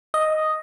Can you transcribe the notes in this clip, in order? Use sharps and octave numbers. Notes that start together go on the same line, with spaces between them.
D#5